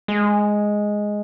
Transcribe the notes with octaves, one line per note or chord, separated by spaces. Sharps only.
G#3